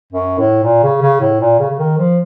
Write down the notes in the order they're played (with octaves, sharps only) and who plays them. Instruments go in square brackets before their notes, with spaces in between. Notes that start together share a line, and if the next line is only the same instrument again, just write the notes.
[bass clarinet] F#2
A2
A#2
C#3
C#3
A2
A#2
C#3
C#3
D#3
F3